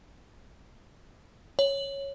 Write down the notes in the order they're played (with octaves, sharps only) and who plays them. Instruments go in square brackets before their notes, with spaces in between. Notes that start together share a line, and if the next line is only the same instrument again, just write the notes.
[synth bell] C#5